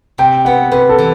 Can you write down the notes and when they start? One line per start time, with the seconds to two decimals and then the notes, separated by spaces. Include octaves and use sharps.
0.18 C3 G5
0.45 B3 F#5
0.71 C3 B4
0.89 A4
0.98 E3